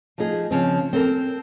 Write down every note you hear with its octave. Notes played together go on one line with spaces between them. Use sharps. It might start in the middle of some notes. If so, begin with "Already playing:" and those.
F3 A3 D#4 G#4
C#3 F3 C4
C4 A4 A#4 A5